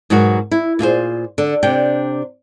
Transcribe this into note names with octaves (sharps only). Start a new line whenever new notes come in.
G#2 B2 F#3 F#4 A#4
E4
A#2 F4 G#4 C5
D3
C3 D4 G5